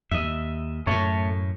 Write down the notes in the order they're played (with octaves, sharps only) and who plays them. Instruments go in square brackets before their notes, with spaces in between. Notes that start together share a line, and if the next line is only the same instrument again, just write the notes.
[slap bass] D#2 [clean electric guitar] D#5 E5
[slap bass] F#2 A2 [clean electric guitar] A3 C#5